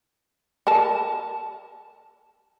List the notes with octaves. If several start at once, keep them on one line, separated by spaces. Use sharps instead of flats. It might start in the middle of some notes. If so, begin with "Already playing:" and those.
A4 A#4 A5